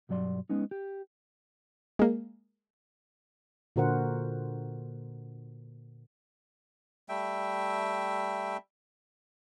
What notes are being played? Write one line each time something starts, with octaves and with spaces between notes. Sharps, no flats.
B1 G2 F#3 D5 C6
G#3 B3 C#4 D#4
G4
G#3 A#3
A#2 D3 F#4 A#4 C5 F#5
G3 A3 E5 G5